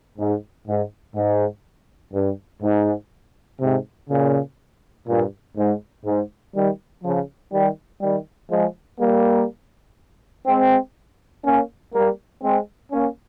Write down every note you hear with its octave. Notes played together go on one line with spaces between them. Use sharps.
G#2
G#2
G#2
G2
G#2
G#2 C3
A#2 C#3
G2 A#2
G#2
G#2
D#3 G3
C#3 F3
D#3 G3
D#3 G3
F3 G#3
G3 A#3
G#3 C4
A#3 C#4
G3 A#3
G#3 C4
A#3 C#4